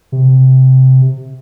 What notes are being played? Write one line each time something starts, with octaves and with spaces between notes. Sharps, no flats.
C3